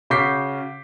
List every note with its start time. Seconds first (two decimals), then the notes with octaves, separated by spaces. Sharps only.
0.10 C#3 F#4 D6 G6 B6 C7